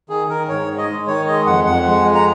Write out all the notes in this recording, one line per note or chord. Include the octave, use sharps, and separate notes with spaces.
D#3 G#4
D#3 A#4
G#2 C#5
G#2
D#5
G#3
D#3 C#5
G#3 D#5
F2 F#5
F2 F#5
G#3
F2
A#5